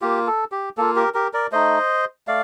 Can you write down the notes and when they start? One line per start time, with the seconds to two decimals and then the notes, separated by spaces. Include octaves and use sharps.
0.02 A#3 F4 G4
0.27 A4
0.52 G4
0.77 A#3 F4 A4
0.96 G4 A#4
1.14 G4 A#4
1.33 A#4 D5
1.52 A3 D#4 C5 D#5
2.27 A3 D5 F5